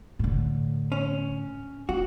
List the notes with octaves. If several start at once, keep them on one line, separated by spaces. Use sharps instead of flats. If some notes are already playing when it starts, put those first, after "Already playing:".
A2 D3
C#4
A#3 F#4